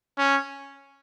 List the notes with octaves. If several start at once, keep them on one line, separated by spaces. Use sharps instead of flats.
C#4